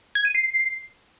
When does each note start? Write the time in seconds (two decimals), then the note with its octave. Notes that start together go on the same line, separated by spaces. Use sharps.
0.15 G#6
0.25 D#7
0.35 C7